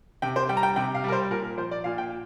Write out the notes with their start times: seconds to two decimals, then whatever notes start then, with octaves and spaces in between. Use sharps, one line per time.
0.22 C3 G5
0.36 C5
0.49 G3 G5
0.57 A#5
0.63 G5
0.76 C3 G5
0.95 F5
1.04 G3 A#4
1.12 C5
1.31 A#2 A#4
1.44 A#4
1.57 F3 C5
1.71 D5
1.84 A#2 F5
1.98 G5